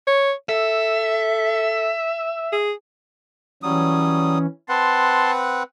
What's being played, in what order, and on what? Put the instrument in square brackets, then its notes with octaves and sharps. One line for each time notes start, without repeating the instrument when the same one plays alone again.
[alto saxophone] C#5
[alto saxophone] A4 [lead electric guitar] E5
[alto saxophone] G#4
[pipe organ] E3 C#4 [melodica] F#3 G3 D#6
[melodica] C4 B4 F#5 [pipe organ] A5 C6